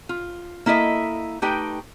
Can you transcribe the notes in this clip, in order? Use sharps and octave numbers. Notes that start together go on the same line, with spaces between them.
F4
A#3 E4 A4 D#5 E5
A3 D#4 G4 B4 G5